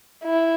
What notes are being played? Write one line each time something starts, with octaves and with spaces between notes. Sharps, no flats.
E4